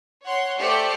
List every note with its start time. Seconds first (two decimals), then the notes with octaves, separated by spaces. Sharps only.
0.23 C#5 F#5 C6
0.59 A3 G4 C5 D5 C#7